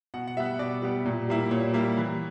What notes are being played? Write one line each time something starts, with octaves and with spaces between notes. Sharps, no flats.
B2 F#5
F#5
G3 B3 E5
B2 D5
G3 B3
A#2
G3 A#3 E4
A#2 C#5
G3 A#3 E4
E3